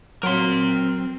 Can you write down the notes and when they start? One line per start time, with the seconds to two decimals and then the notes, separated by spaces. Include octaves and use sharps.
0.23 F#3 C4 A#4 C6